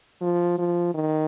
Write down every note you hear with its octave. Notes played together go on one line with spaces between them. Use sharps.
F3
F3
D#3